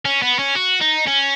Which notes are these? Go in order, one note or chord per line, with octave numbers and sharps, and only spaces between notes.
C#4
B3
C#4
F#4
D#4
C#4